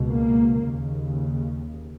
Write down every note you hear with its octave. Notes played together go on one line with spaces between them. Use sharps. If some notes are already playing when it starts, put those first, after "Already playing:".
Already playing: C#2 B2
A#3
D#2 C#3